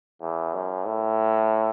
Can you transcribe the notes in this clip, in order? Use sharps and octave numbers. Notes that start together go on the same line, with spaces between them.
E2
F#2
A2